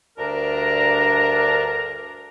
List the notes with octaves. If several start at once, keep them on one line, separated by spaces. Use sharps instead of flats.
D2 G2 D4 A#4 A#5